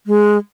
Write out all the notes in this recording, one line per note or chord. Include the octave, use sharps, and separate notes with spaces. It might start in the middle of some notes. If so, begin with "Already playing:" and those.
G#3